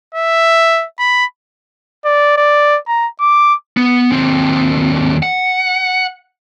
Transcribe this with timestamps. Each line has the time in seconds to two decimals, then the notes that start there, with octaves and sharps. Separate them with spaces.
0.14 E5
0.99 B5
2.05 D5
2.37 D5
2.88 A#5
3.20 D6
3.77 B3
4.12 D#2 C4
5.23 F#5